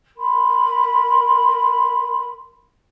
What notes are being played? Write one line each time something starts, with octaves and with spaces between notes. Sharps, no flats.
A#4 B5 C6